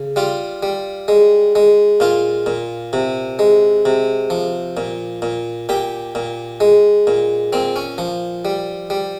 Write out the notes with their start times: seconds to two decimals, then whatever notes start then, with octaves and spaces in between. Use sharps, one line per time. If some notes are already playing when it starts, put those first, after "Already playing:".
Already playing: C#3
0.16 G3 F4
0.63 G3
1.08 G#3
1.55 G#3
2.00 A#2 F4
2.46 A#2
2.93 C3
3.39 G#3
3.85 C3
4.30 F3
4.77 A#2
5.22 A#2
5.69 A#2 G4
6.15 A#2
6.60 G#3
7.07 A#2
7.53 A#2 C4
7.76 C#4
7.98 F3
8.45 G3
8.90 G3